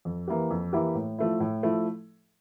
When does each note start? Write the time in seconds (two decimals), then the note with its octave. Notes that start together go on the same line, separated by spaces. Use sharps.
0.05 F2
0.28 E3 A#3 E4 G4
0.51 F2
0.73 E3 A#3 E4 G4
0.95 A2
1.18 F3 A3 E4
1.40 A2
1.63 F3 A3 E4